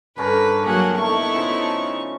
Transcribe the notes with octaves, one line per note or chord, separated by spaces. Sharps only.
G2 D3 C#4 A#4 B4
F#3 A#3 G#4 F#5
A3 B3 D#4 E4 C#6
C#3 F3 A5